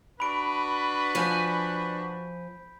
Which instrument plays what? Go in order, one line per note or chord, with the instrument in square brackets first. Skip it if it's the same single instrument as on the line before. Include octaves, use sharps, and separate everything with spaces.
[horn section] D4 F#4 B4 [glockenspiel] B5 D7
[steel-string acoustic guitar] F3 G#5 [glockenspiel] G6 B6